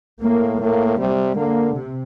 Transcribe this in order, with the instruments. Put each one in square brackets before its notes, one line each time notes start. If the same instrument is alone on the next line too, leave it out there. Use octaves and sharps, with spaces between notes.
[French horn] A2 [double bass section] A#3
[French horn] A2 [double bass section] A#3
[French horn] C3 [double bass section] G3
[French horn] D3 [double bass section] A#3
[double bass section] C3